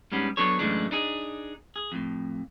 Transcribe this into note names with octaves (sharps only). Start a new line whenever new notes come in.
G#2 G3 B3 C#4 D4
F#3 B3 D4 A4 C#5
F#2 A2 E3 G#3 A3 D4
D4 D#4 G#4
G#4
F2 A2